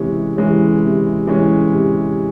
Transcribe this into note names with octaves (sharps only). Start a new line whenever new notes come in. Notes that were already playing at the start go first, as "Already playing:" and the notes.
Already playing: C3 E3 G#3 C#4
E3 G#3 C#4
C3
E3 G#3 C#4
C3